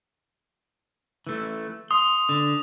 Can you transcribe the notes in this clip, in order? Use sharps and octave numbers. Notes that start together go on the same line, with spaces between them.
E3 A3
C6 D#6
D3